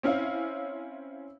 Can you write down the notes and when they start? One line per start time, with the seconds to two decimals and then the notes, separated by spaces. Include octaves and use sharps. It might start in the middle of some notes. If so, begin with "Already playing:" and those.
0.03 C4 C#4 E4 F5